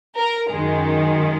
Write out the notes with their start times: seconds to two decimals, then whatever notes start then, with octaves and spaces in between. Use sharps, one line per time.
0.17 A#4
0.51 F#2 D#3 G#3